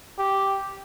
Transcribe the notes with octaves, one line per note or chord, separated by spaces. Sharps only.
G4